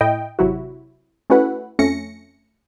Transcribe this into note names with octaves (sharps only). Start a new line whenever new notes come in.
A2 E4 D#5 G5
G#1 C3 F#3 E4 F#4
A3 C#4 E4 F#4 B4 F#5
F2 A3 C#4 A#6 C#7